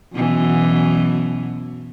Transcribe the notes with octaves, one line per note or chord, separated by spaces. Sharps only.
F#2 B2 E3